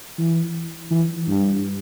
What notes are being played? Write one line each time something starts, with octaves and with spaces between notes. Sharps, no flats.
E3
E3
G2